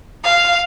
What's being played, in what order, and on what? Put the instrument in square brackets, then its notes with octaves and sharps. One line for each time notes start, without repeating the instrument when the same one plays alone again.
[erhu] F5